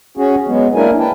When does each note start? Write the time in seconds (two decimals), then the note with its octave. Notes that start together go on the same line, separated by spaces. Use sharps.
0.17 C#4 F#4 G#4
0.47 F#3 G#3 B3
0.75 A#3 D4 E4 A#4 G#5
0.99 B4 G5 A5